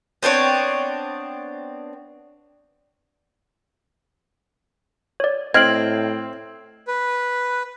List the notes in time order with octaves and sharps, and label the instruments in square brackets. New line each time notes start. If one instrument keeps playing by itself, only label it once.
[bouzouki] B3 C4 D4 C#5
[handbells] C#5 D5
[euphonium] A2 [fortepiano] C4 [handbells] D#5 F6 D7 [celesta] G#6 C7 F#7
[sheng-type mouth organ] B4